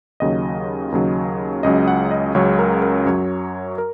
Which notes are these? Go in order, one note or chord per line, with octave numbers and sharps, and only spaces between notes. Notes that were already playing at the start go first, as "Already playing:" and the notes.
D#2 C#3 F#3 D#5
D#2 C#3 F#3
C#2 C#3 F#3 D#5
F#5
D#5
C#2 C#3 F#3 C#5
A#4
A#4
F#2 F#3 C#5
A#4